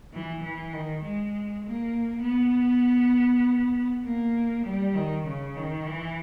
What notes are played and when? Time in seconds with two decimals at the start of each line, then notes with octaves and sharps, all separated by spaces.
0.13 E3
0.43 E3
0.73 D#3
1.03 G#3
1.64 A#3
2.24 B3
4.04 A#3
4.65 G3
4.95 D#3
5.25 C#3
5.56 D#3
5.86 E3